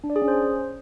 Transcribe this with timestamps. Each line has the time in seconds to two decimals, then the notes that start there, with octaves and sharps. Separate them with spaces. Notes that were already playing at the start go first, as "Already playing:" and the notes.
0.04 D4
0.10 D5
0.16 G#4
0.22 C#4
0.28 C5